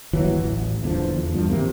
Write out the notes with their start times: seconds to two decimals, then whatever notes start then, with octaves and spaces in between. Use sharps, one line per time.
0.13 G1 D#2 E3 F#3
0.44 A1
0.83 D#1 E2 D3 F3
1.16 E2
1.33 E2 G2 F3
1.50 A1 D#2 C3 A#3